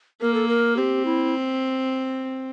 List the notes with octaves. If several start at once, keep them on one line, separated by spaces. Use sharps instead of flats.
A#3 A#4
A4
A#4
C4 G4
E4